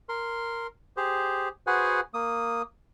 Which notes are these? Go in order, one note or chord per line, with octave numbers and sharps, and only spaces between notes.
A#4 C6
G4 G#4 C5
F#4 G#4 B4 C5 F#5 G#5
A#3 D#6